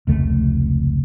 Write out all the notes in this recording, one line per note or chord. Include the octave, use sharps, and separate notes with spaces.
F1 C#2 A3